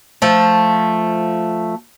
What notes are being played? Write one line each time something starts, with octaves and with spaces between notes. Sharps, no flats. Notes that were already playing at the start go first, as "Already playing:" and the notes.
F3 A3